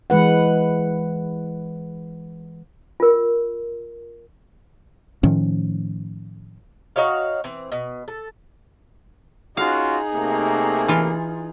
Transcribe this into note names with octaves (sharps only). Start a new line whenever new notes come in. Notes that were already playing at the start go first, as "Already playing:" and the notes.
E3 G#3 B4 F#5
F4 A#4
A2 D#3 F3 C#4
D#4 F#4 C#5 F5
E3 C4
B2
A4
C#4 D#4 F4 F#4 G#4 F5
C3 A3 A#3
E3 F4